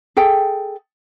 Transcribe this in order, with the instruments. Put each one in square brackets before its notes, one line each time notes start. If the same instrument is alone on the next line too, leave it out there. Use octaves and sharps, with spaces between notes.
[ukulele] G#4 A4 G5